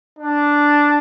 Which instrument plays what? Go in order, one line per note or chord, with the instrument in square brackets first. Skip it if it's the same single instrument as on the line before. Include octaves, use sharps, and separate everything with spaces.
[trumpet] D4